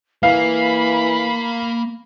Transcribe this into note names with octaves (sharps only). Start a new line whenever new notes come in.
E3 A#3 F5 B5